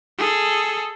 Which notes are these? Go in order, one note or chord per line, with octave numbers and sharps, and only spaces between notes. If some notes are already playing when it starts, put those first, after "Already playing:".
G#4 A4